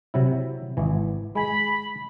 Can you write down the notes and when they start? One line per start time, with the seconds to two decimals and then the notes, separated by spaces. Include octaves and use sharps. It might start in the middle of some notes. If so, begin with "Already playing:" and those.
0.14 C3 F#3 E4
0.77 G#1 E3
1.35 G#3 G#5 B5